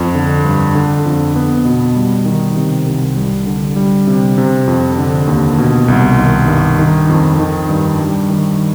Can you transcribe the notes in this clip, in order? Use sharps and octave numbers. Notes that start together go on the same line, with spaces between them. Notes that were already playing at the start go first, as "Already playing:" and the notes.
Already playing: F2
D3
G2
D3
F2
B3
B2
G3
D#3
C3
C2
G3
D3
G3
C3
C3
F2
D3
D#2
B2
C2
D#3
G2
D#3
F2
D#3
G2
G3
D#3